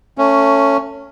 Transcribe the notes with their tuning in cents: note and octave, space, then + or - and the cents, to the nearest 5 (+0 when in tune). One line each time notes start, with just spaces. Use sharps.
A3 +25 C#4 +0